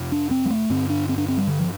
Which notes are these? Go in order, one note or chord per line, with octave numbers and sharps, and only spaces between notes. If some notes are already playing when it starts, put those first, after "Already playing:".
Already playing: F2 C3
D4
C4
G3
A3
G2 D3 C4
D4
C4
D4
C4
G3
D3
F3